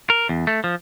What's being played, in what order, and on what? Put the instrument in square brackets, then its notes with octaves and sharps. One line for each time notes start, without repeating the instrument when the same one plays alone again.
[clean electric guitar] A#4
E2
A3
F3